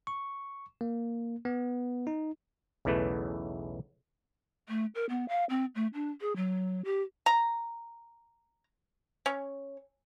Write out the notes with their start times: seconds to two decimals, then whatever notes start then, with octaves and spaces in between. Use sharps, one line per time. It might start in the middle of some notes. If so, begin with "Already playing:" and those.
0.07 C#6
0.81 A#3
1.45 B3
2.07 D#4
2.85 B1 E2 C#3 E3 A3 B4
4.69 A3
4.95 A#4
5.09 B3
5.29 F5
5.50 C4
5.75 A3
5.94 D4
6.21 G#4
6.36 F#3
6.85 G4
7.26 A#5
9.26 C#4